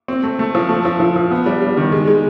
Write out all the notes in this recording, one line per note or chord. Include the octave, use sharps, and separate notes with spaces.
C4
A3
A3
F3
A3
F3
F3
F3
B3
G3
G3
D#3
G#3
G#3